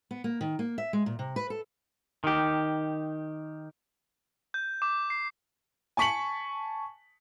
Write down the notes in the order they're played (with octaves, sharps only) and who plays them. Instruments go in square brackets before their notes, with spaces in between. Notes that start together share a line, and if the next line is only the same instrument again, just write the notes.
[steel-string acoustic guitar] B3
A#3
D#3
A#3
E5
G#3
A#2
C3
B4
A4
[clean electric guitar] D#3 G4
[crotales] G6
D6
C7
[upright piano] G#5 A5 C#6 B6 C#7 F#7